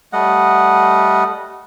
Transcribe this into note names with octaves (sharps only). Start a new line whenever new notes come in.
G3 A3 D#5 F#5